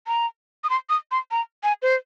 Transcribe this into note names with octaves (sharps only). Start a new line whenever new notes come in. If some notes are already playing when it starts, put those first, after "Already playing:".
A#5
D#6
C6
D#6
C6
A#5
G#5
C5